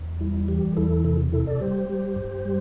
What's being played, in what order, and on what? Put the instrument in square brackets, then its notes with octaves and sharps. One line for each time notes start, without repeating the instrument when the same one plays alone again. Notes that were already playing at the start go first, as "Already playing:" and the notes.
Already playing: [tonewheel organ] E2
G3 E4
E4
E3 G4
E2 E4 A4
C3 E4 A4
C3 E4 A4
A4 D5
G3 G4 C5
G3
G2
G3